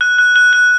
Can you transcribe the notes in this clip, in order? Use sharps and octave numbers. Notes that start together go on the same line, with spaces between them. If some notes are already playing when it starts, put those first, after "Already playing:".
F#6
F#6
F#6
F#6